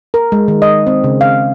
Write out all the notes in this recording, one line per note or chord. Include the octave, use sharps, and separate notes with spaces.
A#4
G#3
D#3
D#5
C4
C#3
F5